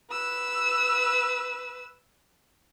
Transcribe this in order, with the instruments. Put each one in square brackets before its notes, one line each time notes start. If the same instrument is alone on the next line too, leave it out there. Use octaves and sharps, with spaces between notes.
[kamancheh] B4 E6